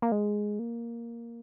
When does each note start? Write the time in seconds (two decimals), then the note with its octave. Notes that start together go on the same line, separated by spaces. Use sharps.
0.02 A#3
0.12 G#3
0.59 A#3